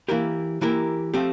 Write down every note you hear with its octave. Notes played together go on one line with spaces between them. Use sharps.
E3 A#3 E4 G4 A#4
E3 A#3 E4 G4 A#4
F3 A3 C4 G4